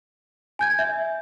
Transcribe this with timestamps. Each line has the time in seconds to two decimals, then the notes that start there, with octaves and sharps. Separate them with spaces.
0.59 G#5 G6 G#6
0.79 E5